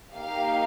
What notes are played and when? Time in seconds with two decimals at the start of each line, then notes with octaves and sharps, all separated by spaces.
0.14 A#3 D#4 G4 F5